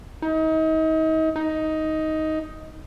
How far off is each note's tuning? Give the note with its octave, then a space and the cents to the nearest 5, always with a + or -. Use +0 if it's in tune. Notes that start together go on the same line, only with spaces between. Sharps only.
D#4 +35
D#4 +10